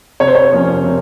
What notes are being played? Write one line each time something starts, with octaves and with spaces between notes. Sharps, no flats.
C3 C#5
C5
C#5
F3 A#3 C#4
C3